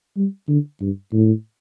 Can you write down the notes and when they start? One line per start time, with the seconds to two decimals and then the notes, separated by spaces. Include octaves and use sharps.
0.17 G3
0.48 D3
0.80 G2
1.12 A2